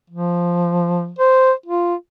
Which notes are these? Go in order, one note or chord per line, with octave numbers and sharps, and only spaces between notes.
F3
C5
F4